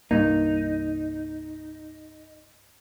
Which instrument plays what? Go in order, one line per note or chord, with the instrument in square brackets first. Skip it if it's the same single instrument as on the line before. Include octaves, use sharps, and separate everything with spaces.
[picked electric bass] C2 G2 A#3 [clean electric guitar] D#4